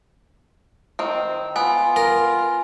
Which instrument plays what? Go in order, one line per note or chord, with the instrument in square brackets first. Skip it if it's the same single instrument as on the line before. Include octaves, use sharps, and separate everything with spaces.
[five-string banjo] D#3 C4
[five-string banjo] B3 [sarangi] F4 [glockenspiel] G#5
[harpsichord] A#4